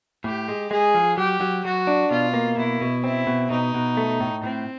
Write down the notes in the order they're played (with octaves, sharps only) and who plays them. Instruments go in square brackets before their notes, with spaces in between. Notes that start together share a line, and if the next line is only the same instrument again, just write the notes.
[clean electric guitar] A2 [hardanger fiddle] G4
[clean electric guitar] G#3
[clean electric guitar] G#3 [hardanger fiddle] G#4
[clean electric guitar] F3
[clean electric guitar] F#3 [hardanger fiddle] G4
[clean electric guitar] F#3
[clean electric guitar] F#3 [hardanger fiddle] F#4
[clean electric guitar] D4
[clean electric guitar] B2 [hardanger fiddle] F4
[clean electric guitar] A#3
[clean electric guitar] B2 [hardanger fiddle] E4
[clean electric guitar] B2
[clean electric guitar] C4 [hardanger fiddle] E4
[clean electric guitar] B2
[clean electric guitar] B2 [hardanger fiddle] D#4
[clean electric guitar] B2
A3
A2
[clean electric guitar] A2 [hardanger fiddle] C4